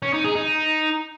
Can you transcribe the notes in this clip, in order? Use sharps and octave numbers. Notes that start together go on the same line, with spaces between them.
C#4
D#4
G#4
D#4